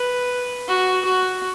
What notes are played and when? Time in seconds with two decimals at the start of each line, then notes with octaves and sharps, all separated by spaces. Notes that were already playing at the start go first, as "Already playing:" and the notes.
Already playing: B4
0.68 F#4
1.05 F#4